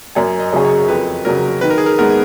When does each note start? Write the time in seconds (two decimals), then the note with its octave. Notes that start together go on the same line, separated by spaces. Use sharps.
0.15 F#2 G#5
0.40 D#5
0.52 C#3 F#3 C#4 G#4
0.65 C#5
0.88 F2 B4
1.25 C#3 F#3 A#4
1.61 D#3 B4
1.70 A#4
1.78 G#4
1.86 A#4
1.98 G#3 B3 A#4